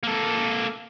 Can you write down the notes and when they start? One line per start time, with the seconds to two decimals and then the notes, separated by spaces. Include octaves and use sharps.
0.03 A#3 A4